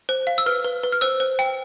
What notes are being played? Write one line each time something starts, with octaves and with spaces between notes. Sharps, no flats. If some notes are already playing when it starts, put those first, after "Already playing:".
C5
F5
E6
B4 F6
B4
B4
F6
C5 E6
C5
G5